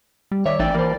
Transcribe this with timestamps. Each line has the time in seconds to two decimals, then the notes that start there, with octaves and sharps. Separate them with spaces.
0.32 G3
0.46 D#3 C#5 D5 E5
0.60 A1 E3 D#4 D5 E5 G5
0.74 E3 G3 A#3 C5